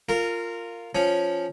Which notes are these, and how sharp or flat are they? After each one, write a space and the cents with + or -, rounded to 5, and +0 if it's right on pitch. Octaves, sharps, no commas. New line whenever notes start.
F4 +0 A#4 -20
F3 +0 C#4 +0